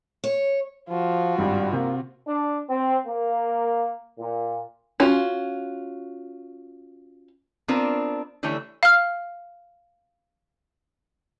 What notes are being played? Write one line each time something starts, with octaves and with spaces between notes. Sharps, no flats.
C#5
F3 F4 F#4
G#1 G2 G3
C3 A#3
D4
C4
A#3
A#2
C#4 F4 F#4
B3 C4 D4 F4 A#4
D3 E3 G3 A3 C#5 E5
F5 F6